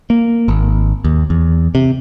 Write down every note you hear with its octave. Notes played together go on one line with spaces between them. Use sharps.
A#3
G#1
D#2
E2
C3